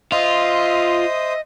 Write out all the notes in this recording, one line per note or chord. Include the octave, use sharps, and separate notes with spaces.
F4 C5 D#5 E5 D#6